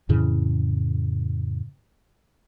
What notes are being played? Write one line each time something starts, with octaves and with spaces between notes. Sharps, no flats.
F2 A2 C#3 E3